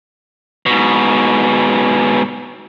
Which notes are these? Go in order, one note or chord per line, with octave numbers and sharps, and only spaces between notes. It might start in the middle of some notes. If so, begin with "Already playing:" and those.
G#2 B2